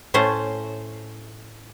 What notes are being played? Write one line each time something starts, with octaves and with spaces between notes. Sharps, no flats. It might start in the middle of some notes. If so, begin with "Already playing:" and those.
A2 A3 C#4 C5